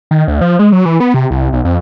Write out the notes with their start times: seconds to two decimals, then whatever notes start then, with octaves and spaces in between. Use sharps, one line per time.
0.11 D#3
0.28 D2
0.41 F3
0.59 G#3
0.72 F#3
0.86 E3
1.00 B3
1.14 C3
1.31 C2
1.53 B1
1.65 F2